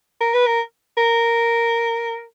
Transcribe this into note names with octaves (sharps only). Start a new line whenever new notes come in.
A#4
B4
A#4
A#4